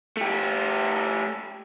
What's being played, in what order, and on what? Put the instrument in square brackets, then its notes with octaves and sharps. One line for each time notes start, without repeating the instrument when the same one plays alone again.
[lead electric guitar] A3 G4